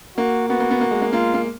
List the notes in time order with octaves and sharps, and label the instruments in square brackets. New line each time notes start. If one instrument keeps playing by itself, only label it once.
[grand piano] A#3 [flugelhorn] F#4
[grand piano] B3 [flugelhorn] F#4
[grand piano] A#3
B3
A#3
G#3
A#3
[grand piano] A#3 [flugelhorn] F4
[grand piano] A#3